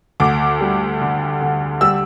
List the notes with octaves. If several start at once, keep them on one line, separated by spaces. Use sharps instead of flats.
D2 D6
G3
D3
D3
G3 E6